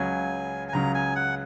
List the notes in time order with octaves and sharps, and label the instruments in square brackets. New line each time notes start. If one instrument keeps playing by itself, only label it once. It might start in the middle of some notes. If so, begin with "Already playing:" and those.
Already playing: [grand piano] C#2 C#3 F#3 [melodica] G#5
[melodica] G#5
[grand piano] C#2 C#3 F#3 [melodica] A#5
[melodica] G#5
F#5